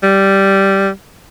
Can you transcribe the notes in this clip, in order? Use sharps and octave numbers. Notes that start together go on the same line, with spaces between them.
G3